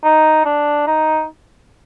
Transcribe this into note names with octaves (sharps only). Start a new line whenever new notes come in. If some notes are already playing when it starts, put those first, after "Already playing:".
D#4
D4
D#4